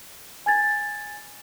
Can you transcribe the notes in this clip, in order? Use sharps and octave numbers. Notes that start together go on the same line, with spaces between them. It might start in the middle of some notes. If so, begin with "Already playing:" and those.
G#5 G#6 A6